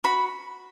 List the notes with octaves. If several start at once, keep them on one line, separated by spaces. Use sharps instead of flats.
F#4 B5